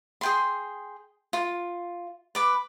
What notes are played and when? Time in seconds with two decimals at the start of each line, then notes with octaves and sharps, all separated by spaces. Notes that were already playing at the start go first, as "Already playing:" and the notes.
0.21 G#4 G5 C6
1.33 F4
2.35 B4 D6